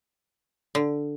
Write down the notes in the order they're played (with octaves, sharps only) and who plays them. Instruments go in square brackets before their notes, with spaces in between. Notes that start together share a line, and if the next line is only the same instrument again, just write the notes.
[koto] D3